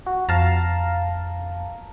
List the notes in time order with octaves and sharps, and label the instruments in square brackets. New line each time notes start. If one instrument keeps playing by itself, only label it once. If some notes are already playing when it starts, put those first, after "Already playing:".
[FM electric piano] F#4
[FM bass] F2 [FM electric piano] F5 A5 A#5